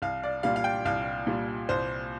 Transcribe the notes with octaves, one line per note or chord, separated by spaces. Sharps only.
C2 F5
D5
A#2 G3 F5
F5
G5
C2 F5
A#2 G3
C2 C5